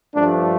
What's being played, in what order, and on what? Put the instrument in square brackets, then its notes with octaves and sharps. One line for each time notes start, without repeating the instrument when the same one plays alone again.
[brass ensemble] G2 F3 A3 D4